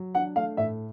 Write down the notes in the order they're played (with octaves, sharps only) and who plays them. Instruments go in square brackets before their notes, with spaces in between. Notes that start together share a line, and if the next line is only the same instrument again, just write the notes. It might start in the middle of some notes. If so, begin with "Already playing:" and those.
Already playing: [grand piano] F#3
[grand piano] D4 [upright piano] F#5
[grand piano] A3 [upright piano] F5
[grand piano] A2 [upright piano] E5